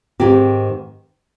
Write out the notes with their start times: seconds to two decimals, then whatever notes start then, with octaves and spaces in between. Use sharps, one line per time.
0.20 G#2 D#3 G#3 C4 G4